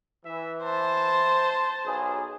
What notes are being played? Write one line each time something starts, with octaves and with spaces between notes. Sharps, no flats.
E3 E5
C5 A5
B1 G#4